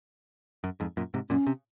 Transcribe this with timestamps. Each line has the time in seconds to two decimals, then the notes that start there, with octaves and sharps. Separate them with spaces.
0.64 F#2
0.80 F2 G#2
0.97 F#2 A#2
1.14 G#2 C3
1.30 F#2 A#2 C#4
1.47 C3